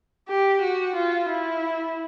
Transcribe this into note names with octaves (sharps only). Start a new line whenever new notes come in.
G4
F#4
F4
E4